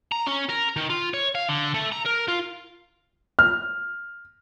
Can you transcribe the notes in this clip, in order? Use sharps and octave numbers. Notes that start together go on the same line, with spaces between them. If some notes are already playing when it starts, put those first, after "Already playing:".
A#5
C#4
A#4
D#3
F4
C#5
F5
D3
A3
A#5
A#4
F4
F6